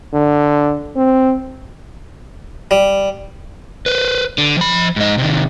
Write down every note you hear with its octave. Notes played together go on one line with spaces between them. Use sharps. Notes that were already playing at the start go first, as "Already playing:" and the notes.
D3
C4
G3
B4 C5
D3
F3 B5
G#2 D#4
C3 D#3